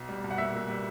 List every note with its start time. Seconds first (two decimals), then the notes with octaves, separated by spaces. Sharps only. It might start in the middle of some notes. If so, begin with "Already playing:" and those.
Already playing: B1
0.09 G3
0.24 B1
0.31 F#5
0.38 A#2 E5
0.53 A#2
0.69 G3